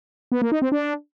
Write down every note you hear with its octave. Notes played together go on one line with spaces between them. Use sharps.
B3
A#3
D#4
C4
D4